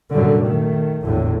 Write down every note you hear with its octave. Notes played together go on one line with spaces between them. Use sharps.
F1 F#2 A#2 D3 G3
D#3 A3
G#1 E2 A2 D3